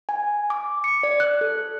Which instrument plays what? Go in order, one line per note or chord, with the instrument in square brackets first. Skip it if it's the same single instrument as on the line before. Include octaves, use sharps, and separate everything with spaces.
[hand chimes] G#5
D6
C#7
D5
F#6
A4